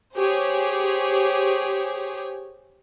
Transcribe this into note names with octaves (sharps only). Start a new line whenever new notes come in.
G4 G#4 C5 C#5